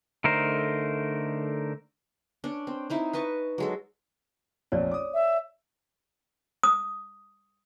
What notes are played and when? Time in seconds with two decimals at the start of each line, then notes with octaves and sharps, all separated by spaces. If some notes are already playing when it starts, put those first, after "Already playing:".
0.24 D3 A3 D#4 A#4 C5
2.44 C#4 D4
2.67 C4
2.90 C4 D#4 E4
3.13 B4 D#5 A5 C#6
3.58 F#3 G#3 A4
4.72 F1 A#1 F2 C#5 D5
4.91 D6 D#6
5.14 E5
6.63 D#6